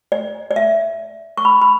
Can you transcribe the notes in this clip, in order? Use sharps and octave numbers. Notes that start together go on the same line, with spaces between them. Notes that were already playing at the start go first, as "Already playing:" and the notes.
D5
D5
E5
C#6
B5
B5